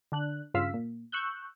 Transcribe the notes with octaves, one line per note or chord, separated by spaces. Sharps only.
D3 D4 F#6
G2 C#3 F4 F5 E6 B6
A#2
C#6 E6 F#6 G6